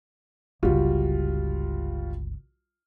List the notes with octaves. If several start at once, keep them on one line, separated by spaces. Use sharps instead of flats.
G1 C#2 G3 F4 F#4